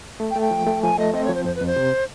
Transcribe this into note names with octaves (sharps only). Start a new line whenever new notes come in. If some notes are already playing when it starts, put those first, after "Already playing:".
A3
G5
A3
G5
F3
A3
F3 G#5
A3 D#5
C4 D#5
F3 C#5
C5
F2 C5
B4
F2
C5
C3